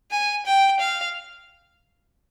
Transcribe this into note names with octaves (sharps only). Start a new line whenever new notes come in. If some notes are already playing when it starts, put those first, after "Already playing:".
G#5
G5
F5